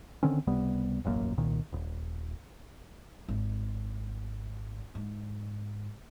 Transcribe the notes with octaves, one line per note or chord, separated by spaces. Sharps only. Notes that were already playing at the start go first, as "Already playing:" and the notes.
D3 D#3 C4 C#4
C#2 C3 G3 B3
E1 A1 F#2 A#3
C2 A#2 D#3
D#1
G#1
G#2